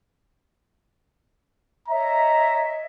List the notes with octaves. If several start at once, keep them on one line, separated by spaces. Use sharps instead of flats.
C#5 D#5 E5 A#5